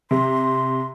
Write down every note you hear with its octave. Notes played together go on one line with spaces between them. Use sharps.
C3 C6